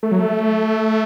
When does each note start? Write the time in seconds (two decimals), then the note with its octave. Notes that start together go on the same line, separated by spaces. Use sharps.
0.03 A3
0.12 F#3
0.19 A3